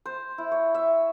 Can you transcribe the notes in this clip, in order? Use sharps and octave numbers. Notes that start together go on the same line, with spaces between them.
C5
E4
C#5
E5